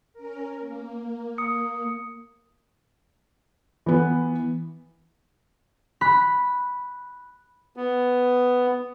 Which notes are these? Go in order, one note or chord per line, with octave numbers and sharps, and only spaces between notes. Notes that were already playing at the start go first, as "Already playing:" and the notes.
C#4 A#4
A#3
D#6 C#7
E3 B3
B5 F#6 B6
B3